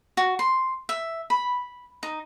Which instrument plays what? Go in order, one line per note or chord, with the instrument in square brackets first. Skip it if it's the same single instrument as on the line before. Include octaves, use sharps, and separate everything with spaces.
[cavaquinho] F#4
C6
E5
B5
D#4